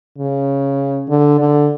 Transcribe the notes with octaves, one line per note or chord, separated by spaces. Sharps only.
C#3
D3
D3